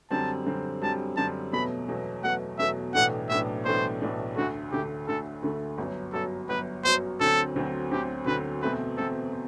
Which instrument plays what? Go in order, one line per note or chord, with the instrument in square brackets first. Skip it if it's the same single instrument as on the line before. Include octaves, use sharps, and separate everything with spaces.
[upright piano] F#2 D3 G3 C4 [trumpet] A5
[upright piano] F#2 D3 G3 C4
[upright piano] F#2 D3 G3 C4 [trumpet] A5
[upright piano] F#2 D3 G3 C4 [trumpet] A5
[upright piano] E2 B2 F#3 A3 [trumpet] B5
[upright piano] E2 B2 F#3 A3
[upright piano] E2 B2 F#3 A3 [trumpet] F#5
[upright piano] E2 B2 F#3 A3 [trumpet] E5
[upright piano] B1 A2 E3 A3 D4 [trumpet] F#5
[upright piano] B1 A2 E3 A3 D4 [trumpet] E5
[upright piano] B1 A2 E3 A3 D4 [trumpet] C5
[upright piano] B1 A2 E3 A3 D4
[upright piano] D2 D3 A3 [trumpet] F#4
[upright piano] D2 D3 A3 [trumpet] G4
[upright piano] D2 D3 A3 [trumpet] A4
[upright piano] D2 D3 A3
G1 F#2 F#3
[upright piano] G1 F#2 F#3 [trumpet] A4
[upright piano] G1 F#2 F#3 [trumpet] B4
[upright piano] G1 F#2 F#3 [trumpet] C5
[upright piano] D2 D3 F#3 C4 [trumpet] A4
[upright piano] D2 D3 F#3 C4
[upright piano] D2 D3 F#3 C4 [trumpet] G4
[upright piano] D2 D3 F#3 C4 [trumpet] B4
[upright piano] E2 B2 A3 C4 [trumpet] B4
[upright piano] E2 B2 A3 C4 [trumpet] A4
[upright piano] C4